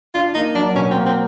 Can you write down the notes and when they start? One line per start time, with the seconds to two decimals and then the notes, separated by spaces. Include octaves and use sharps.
0.14 D4 F4
0.34 A#3 D#4
0.55 F#3 D4
0.75 B2 C#4
0.91 C4
0.96 A#3
1.06 C4